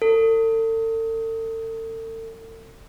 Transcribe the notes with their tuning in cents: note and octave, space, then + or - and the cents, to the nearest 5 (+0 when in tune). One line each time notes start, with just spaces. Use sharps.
A4 +40